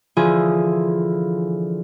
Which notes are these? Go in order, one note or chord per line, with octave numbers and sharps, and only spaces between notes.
D3 E3 F3 F4 G#4